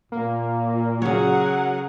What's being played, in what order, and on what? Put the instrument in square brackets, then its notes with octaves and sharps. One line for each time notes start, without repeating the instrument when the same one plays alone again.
[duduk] A#2 [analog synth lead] A#3
[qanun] C#3 C#5 [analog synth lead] F#3 [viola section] G#4 A#4 F#5